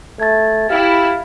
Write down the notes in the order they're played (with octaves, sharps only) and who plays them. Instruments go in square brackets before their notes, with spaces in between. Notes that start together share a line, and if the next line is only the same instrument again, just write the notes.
[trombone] A3 [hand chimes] G#6 A6
[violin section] E4 [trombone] G4 [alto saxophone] F5